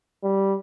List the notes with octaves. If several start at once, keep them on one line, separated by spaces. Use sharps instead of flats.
G3